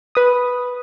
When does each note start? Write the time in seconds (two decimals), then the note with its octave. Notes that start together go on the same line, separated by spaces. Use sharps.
0.15 B4 D#6